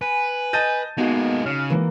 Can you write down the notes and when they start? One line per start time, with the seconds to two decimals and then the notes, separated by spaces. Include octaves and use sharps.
0.02 B4 G#5
0.53 D#5 A5 G6 A6 D#7
0.98 G#3 A#3 B3 D#4 F#4
1.46 C#3 F6
1.70 E3 G#3 A#3